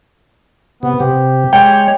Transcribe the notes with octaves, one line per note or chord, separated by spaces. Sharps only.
C3 B3
C3 G4
G#3 C#5 G5